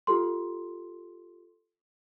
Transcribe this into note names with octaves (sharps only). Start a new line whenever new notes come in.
F4 G4 A4 C6